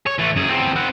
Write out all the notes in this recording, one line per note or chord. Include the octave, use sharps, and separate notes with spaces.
C#5
E3 A3
F#2 G#4
E2 C4
C4 F#5